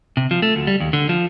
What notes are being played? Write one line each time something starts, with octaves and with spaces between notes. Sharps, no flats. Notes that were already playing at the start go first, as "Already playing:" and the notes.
C3
F3
A3
D2
G3
D#2
D3
F3